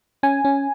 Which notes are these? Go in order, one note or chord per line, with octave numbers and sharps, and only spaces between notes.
C#4 G#5
C#4